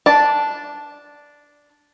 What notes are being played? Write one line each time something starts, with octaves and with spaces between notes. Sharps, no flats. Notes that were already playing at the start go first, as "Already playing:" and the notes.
D4 A5